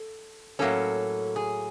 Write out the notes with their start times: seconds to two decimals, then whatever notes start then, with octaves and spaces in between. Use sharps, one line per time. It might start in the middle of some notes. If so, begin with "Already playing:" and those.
Already playing: A4
0.59 A2 F#3 A#3 C#4 A4
1.36 G#4